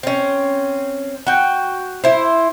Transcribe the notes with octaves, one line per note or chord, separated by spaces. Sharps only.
C4 C#4
F#4 G5
E4 C5